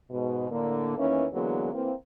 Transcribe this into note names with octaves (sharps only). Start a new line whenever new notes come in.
G#2 B2
A2 D3 A#3
E2 D#3 E3 A#3 C#4
D3 E3 F#3 G#3 A#3 B3
E3 A#3 C4